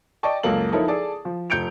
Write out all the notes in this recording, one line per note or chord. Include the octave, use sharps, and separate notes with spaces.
D5 D#5 G5 A5 C#6
C#2 F#2 F#3 A#3 A4 F#7
F3 D#4 E4 A4 A#4 C#5
G#4 A4 D5 A5
F3
F1 G6 C#7 D7 F7